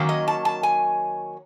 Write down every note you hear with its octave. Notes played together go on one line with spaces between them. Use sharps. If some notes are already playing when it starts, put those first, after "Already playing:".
Already playing: D#3 F#3 A#3 C#4
D#5
A5
A5
G#5